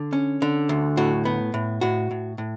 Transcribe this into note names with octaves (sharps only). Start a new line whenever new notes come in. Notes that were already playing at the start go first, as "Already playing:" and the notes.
Already playing: D3
C#4
D3
D2
A2 F#4
B3
A2
A2 F#4
A2
A2